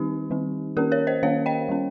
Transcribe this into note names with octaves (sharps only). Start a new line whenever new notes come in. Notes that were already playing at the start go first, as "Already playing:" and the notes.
Already playing: D#3 G3 C4 D#4 G4
D#3 G3 C4
D#3 A#3 C#4 G4 A#4
A#4 C#5
C5 D#5
D#3 A#3 C#4 C#5 F5
D#5 G5
G3 C#4